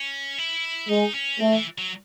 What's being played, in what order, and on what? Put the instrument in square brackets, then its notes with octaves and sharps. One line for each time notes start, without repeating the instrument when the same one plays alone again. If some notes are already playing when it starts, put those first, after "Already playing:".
Already playing: [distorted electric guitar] C#4
E4
[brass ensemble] G#3 [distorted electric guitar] D#4
[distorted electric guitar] C#4
[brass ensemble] A3 [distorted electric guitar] C4
[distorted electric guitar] E3
F#3